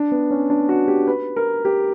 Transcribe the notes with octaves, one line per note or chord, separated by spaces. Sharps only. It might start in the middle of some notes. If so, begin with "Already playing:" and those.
Already playing: D4
B3
C#4
D4
F#4
G4
B4
A#4
G4